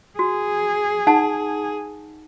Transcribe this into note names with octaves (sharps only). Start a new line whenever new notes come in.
F#4 G#4
D#4 F#5 A5